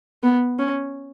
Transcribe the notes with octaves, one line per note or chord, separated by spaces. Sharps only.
B3
C#4